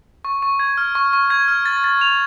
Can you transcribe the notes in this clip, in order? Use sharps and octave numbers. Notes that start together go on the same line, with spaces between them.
C#6
C#6
G#6
F6
C#6
C#6
G#6
F6
A6
A6
F7